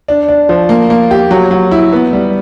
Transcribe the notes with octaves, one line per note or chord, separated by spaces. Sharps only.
D4
D4
F3
A#3
A#3
G4
F#3
F#3
E4
B3
G3